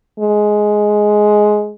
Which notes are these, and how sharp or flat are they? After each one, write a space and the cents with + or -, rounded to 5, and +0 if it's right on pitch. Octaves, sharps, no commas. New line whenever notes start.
G#3 +10